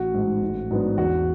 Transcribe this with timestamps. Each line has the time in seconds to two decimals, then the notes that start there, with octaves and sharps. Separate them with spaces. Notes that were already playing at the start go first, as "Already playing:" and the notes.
Already playing: A1 F#4
0.14 G#2 G#3
0.42 A1
0.71 G#2 F#3 B3 D4
0.97 E2 F#4